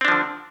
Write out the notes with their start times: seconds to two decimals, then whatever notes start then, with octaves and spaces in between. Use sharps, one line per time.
0.01 C4
0.05 D4
0.08 F3
0.12 D3